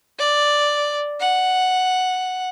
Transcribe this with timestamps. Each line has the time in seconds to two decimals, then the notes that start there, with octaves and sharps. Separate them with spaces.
0.19 D5
1.20 F#5